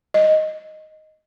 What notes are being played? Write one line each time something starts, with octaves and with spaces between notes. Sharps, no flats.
D#5